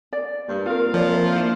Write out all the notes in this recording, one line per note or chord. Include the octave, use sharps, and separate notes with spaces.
D5
G2 A#3
A#3 C4 F4 A#4 F5
F3 C#5 D5
A#4 E5
D4 E4 F4 C5